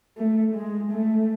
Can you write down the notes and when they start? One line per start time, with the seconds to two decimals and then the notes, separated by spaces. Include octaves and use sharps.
0.18 A3
0.55 G#3
0.91 A3